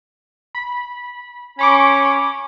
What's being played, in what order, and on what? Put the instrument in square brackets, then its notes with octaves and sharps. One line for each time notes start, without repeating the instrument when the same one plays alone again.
[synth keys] B5
[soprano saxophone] C#4 [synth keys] B5 C#6 D6